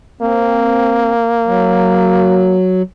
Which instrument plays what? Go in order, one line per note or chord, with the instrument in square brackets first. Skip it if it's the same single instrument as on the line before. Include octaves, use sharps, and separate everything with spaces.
[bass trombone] A#3 [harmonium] C4
[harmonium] F#3